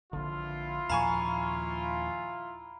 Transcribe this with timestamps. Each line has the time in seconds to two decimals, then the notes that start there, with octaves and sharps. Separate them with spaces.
0.13 A#1 D3 E4 F4
0.90 D#2 A#2 F3 F5 G#5 A#5 B5 C#6